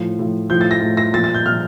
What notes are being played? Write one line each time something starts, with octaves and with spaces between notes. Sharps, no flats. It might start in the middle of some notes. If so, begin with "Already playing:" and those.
Already playing: A2 F3
A2 F3
A2 F3 G6
A6
A#6
A2 F3
A#6
A#2 F3 A6
A6
G6
A#2 F3 F6